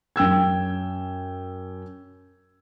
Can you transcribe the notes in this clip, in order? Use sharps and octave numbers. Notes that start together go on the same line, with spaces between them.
F#2 G5 E6 G#6